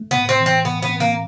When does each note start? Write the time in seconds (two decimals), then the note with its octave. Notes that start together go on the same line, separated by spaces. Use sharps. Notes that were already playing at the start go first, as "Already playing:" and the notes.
Already playing: A3
0.11 A2 B3
0.29 C4
0.40 E3
0.46 C4
0.65 A2 B3
0.82 B3
0.89 C4
1.00 A#3